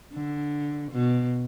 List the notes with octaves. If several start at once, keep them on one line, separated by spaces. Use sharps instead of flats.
D3
B2